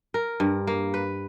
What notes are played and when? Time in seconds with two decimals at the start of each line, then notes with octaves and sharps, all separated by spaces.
0.14 A#4
0.40 G2
0.67 A#3
0.94 B4